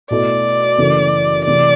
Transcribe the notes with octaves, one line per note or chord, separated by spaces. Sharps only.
B2 A3 E4 A4 D5
F#1 F#2 E3 A3
C3 E3 A3 D5